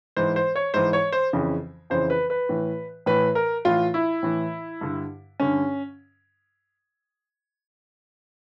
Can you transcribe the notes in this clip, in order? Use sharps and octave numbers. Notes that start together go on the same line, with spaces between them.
G#2 E3 C5
C5
C#5
G#2 E3 C5
C#5
C5
F2 C#3 E3
F2 C#3 E3 C5
B4
B4
A2 E3
A2 E3 B4
A#4
A2 E3 F4
E4
A2 E3
G2 D3
G2 D3 C#4